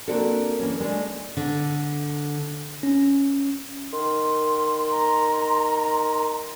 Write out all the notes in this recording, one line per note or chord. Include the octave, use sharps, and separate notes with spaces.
A#3 C4 D4 F#4 A4
E3 A#3 C#4
G#3 A3 D4
D3
C#4
D#3 C6
A#5